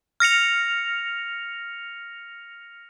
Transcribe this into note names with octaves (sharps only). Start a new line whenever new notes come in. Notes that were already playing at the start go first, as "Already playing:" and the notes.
F6 A#6 C#7 F7